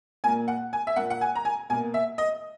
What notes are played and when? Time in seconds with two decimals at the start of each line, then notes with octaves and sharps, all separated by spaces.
0.24 A#2 A#3 G#5
0.48 F#5
0.73 G#5
0.87 E5
0.96 A#2 A#3 F#5
1.10 F#5
1.21 G#5
1.35 A#5
1.45 G#5
1.70 B2 A#3 G#5
1.94 E5
2.18 D#5